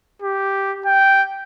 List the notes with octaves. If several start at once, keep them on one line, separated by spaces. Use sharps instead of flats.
G4
G5